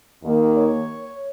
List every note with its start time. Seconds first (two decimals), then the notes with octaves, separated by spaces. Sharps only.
0.23 D#2 D#3 A#3
0.56 C#5